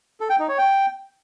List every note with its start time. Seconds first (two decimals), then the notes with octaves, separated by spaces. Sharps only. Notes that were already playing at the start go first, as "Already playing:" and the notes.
0.20 A4
0.30 G5
0.39 D#4
0.49 C#5
0.58 G5